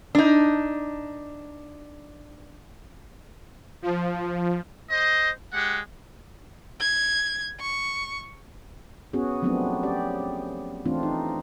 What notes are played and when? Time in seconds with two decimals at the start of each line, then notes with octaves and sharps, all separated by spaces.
0.15 D4 D#4
3.82 F3
4.90 C5 D#5
5.53 G#3 G4 F#5
6.80 G#6
7.61 C#6
9.13 B3 C#4 F#4 G#4
9.42 F3 F#3 A3 B3 C4 D4
9.83 C#4 G4 D5
10.86 E3 A3 C4 D4 F4
11.03 D#4